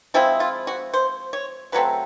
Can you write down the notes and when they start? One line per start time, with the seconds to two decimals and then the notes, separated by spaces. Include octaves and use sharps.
0.14 F3 G#3 C4 E4 F4
0.40 F4
0.67 F#4
0.93 C5
1.33 C#5
1.72 C#3 F#3 A3 C4 B4